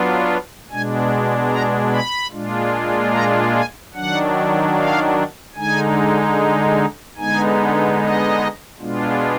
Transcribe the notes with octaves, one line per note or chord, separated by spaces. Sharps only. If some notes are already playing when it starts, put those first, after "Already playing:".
Already playing: F#3 B3 D4 F4
B2 G#3 D4 G#5
A#5
B5
A#2 G#3 D4 F4
A#5
G#5
D#3 F#3 D4 F#5
F5
D3 G#3 D#4 G#5
D3 G#3 B3 D#4 G#5
D#5
B2 G#3 B3 D4 F4